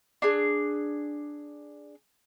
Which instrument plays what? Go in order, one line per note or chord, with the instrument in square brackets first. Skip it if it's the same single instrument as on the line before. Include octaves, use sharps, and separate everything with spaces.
[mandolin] D4 G#4